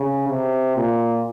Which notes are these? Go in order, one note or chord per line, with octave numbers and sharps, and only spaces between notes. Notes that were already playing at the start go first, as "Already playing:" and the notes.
Already playing: C#3
C3
A#2